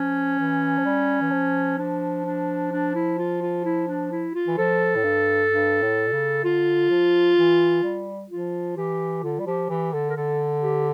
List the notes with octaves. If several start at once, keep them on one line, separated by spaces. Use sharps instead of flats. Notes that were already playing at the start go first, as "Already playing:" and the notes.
Already playing: F3 C#4
E3
F3
G3
E3
F3
F3 D4
D4
D4
E4
F4
F4
E4
D4
E4
F4
E3
F3 A4
A2
G2
G2
A2
A#2
C#3
D3 F4
F3
E3
G3
F3 F4
E3 G4
D3 F4
G3
F3 G4
E3 G4
D3 A4
A#4
D3 A4
G4